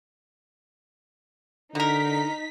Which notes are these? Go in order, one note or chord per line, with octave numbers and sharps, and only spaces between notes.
B2 D3 D#4 A#4 A#5 B6